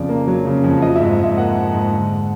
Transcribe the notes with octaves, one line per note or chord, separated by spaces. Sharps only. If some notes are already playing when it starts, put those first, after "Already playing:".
Already playing: F2 C#3 D5
A#3
F#3
C#3
F2
F3 D#5
G#2 E5
G#2 E5
A#3 F#5
F3
G#2
D3